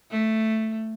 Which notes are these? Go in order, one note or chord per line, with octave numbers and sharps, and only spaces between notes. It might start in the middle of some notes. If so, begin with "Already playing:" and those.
A3